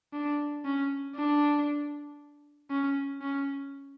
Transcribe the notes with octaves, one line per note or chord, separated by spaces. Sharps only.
D4
C#4
D4
C#4
C#4